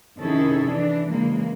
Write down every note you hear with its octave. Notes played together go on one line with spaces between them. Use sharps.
C3 D#3 C#4 E4 G#4 A4
E3 D4
C#3 E3 G#3 A#3